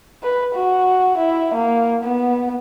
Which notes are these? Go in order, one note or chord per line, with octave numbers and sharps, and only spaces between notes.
B4
F#4
E4
A#3
B3